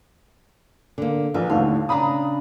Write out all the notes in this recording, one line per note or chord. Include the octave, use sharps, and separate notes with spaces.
D3 A#3
A#1 E3
D#2 A2 D3 F5
C#3 D4 A#5 B5 D#6